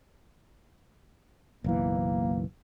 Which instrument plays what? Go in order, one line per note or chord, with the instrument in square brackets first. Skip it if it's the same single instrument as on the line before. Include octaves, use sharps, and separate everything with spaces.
[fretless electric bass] F#1 B1 E3 [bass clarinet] A#3